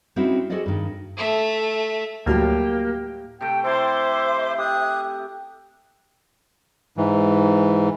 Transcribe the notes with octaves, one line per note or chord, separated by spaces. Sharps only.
G3 C4 C#4 D#4 E4 F#4
F#4 G#4 A4 C5 D5 D#5
G2 D#3
A3 E5
D2 A2 F#3 G3 A#3 G4 A5 F6
C3 A3 G5
C3 E4 A4 C5 E5 C6 D6
G4 D#6 F#6 G#6
G#2 E3